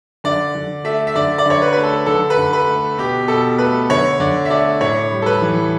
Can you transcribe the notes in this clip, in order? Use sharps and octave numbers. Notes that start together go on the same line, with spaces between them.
D3 D5
D3
A3 E5
E5
D3 D5
D5
D3 C#5
B4
A3 B4
A4
D3 A4
B4
D3
B4
A3
B2 G4
B2 A4
A3 B4
D3 C#5
D3 D5
E5
A3 D5
A2 C#5
G3
A4
B4
E3